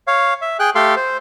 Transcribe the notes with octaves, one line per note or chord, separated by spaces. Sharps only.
C#5 F5
E5
G#4 G5 F#6
A3 G4 A4 F5 C6
C5